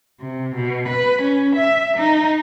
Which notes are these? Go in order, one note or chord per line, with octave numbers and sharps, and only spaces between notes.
C3
B2
B4
C#4
E5
D#4